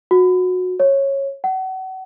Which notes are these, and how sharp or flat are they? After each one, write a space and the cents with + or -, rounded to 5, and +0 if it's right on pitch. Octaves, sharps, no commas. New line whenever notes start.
F#4 -20
C#5 -15
F#5 +35